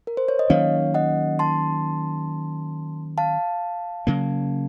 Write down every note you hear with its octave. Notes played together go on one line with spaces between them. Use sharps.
A#4
C5
C#5
D#5
D#3 F#3 A#3 C#4 C#5 F5
D#5 F#5
A5 C6
F5 A5
C#3 F#3 A#3